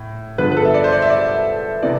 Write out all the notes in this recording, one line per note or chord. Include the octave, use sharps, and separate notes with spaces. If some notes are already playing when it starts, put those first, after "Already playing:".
Already playing: A2
G2 D3 F3 B3 D4 B4
B4
A4
E5
D5
C5
D5
E5
D5
C3 E3 B3 D5